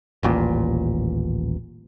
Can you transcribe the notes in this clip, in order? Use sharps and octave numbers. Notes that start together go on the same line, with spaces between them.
D#1 A1 A#2